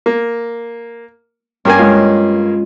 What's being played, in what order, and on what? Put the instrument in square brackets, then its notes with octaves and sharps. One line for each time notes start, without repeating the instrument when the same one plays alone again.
[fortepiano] A#3
[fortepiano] G2 A#3 G#5 [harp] C#4
[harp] G#3 F4